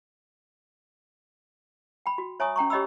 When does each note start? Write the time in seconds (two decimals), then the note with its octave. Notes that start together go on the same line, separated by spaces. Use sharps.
2.06 G5 B5
2.18 F#4
2.40 C#5 E5 G#5 A#5 C#6 D#6
2.56 C#4 G5 A#5 C#6
2.70 G4 C#5 D#5 G5 B5 E6